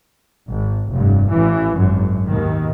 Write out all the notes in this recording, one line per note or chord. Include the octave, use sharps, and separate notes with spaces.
G#1
F1 G2
A1 E3
G#1 F#2
D#2 G#2 B2 D#3